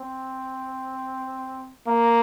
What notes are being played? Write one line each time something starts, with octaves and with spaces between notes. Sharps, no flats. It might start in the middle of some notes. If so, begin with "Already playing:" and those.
Already playing: C4
A#3